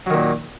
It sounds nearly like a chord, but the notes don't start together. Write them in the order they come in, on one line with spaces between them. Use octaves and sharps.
F#3 D#3 A#2